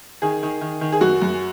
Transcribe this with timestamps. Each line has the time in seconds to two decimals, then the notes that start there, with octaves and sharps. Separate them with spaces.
0.22 D#3 G#4
0.43 D#3
0.61 D#3
0.81 D#3
0.92 G#4
1.01 F#2 F#4
1.22 F#2